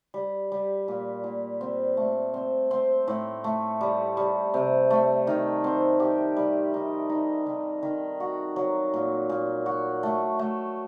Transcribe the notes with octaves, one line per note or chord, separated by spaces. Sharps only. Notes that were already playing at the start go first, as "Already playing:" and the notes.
G3
G3
A#2
A#2
C4
A3
C4
C4
A2
A3
G3
G3
C3
A3
D#3
C4
G4
G3
D#4
D#4
D#3
D#3
F#4
F#3
A#2
A#2
F#4
A3
A3